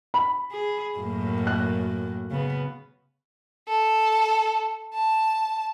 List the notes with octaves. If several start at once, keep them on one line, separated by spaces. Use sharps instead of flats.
B5
G#4
F#2 A2 A#3
F#6
C#3 B3
A4
A5